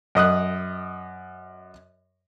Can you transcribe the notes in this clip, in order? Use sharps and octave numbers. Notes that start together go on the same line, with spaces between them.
F#2 D#5 D#6 F#6